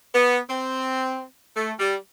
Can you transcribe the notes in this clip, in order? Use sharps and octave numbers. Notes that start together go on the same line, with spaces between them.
B3
C4
A3
G3